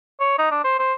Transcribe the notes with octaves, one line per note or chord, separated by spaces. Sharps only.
C#5
D#4
D4
C5
C5